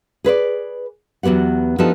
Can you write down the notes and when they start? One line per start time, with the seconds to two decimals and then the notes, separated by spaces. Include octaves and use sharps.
0.24 G#4 B4 C5 D5
1.23 E2 F#3 B3 G4 F#5
1.78 F3 B3 D4 D#4 G4 A4